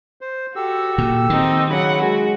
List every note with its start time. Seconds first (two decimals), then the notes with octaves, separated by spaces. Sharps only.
0.21 C5
0.56 F#4 G4 A4 E6
0.98 A#2
1.30 D#3 C4 D#4
1.70 C#3 F#3 F#5 B5
2.02 G#3 F#4